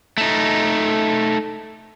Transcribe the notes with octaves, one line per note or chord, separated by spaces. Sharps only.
A3 D#4